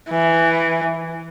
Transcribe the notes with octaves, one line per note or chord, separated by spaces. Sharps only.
E3